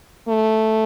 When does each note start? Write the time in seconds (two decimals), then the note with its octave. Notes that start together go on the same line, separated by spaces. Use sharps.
0.28 A3